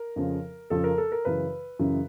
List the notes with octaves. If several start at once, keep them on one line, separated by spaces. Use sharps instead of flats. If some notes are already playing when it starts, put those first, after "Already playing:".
Already playing: A#4
F2 C#3 F3
F2 C#3 F3 A4
A#4
A4
A#4
F#2 C#3 E3 B4
F#2 C#3 E3